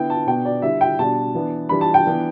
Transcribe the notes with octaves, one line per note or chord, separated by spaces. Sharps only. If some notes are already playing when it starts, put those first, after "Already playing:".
Already playing: D3 B3 E4 G5
A5
B2 B3 D4 G5
D5
D3 G3 E4 E5
G5
B2 G3 D4 A5
E3 B3 D4
E3 G3 D4 B5
A5
G5
E3 B3 D4